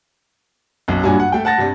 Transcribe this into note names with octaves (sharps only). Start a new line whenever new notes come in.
B1 F#2
G2 A#2 F#3 D4 F#4 G#5
F#5
A3 G5
F#5 A5 A6 A#6
G2 C3 G3